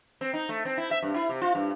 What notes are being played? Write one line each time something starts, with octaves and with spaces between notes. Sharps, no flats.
C4
D#4
A3
C4
E4
E5
G2
E4
C3
F4
G2